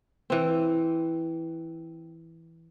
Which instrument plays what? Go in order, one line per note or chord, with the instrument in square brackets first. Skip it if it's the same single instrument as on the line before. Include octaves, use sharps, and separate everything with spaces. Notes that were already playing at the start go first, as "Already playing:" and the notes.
[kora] E3 C4